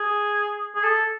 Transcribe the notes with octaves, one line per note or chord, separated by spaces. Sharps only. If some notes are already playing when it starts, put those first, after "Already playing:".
Already playing: G#4
G#4
A4